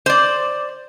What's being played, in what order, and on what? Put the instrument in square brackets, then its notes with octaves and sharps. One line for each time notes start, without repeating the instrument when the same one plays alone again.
[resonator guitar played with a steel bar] C5 D5